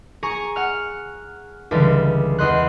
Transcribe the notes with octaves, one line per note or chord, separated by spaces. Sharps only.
G#4 G#5 A#5 C#6
F#5 F6
C#2 D3 E3 G3
E2 D#5 C6 F#6